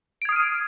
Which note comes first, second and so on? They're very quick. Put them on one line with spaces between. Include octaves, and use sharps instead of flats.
D7 G#6 D#6 F6 D#7